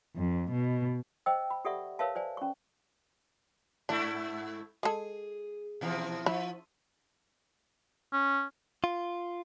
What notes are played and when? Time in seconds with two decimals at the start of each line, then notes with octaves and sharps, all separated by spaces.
0.17 F2
0.52 B2
1.26 C5 D#5 G5 E6
1.50 B5
1.65 G4 A4 D5 E5 F#5 C#6
1.99 A#4 B4 C#5 E5 F5 A5
2.15 C5 D5 G#5
2.37 C#4 C#6
3.89 G#2 A3 D4 E4
4.83 G#3 G#4 A4
5.81 B2 E3 F3
6.26 F3 E4
8.13 C#4
8.84 F4